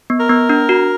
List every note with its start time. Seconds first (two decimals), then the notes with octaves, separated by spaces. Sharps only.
0.10 B3
0.20 A#4
0.29 B3
0.49 D4
0.69 F#4